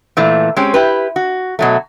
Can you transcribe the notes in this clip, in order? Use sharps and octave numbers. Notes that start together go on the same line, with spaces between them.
A#2 E3 A3
G#3 C4 C#4 G4
E4 G4 B4
F#4
B2 F#3 A3